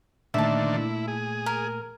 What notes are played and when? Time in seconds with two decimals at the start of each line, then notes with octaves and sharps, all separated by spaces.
0.34 A#2 D3 D#3 A3 A#3 D4 E5 A5
0.77 E4
1.08 G#4
1.46 A#4